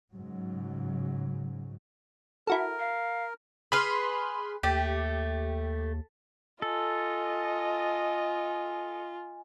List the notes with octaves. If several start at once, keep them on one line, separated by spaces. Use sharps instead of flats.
G#2 C#3 F#3
E4 F#4 A4 A#4
F5
G#4 B4 B5 C6 F6
D#2 A3 G4
F4 A4 D#5 G#5